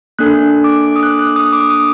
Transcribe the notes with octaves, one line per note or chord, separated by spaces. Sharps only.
A#3 D4 A4 F#6
D6
D6
D#6
F#6
F#6
D#6
D6
D#6